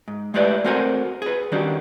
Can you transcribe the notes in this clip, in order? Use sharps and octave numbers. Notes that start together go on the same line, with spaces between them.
G#2
G#3 A3 E4 G4 B4 D5
A3 C4 F#4 A#4 C5 G#5
G#4 B4
D#3 G3 C#4 D4 F#4 G4